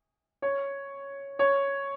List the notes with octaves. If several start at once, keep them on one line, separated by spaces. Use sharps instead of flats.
C#5
C#5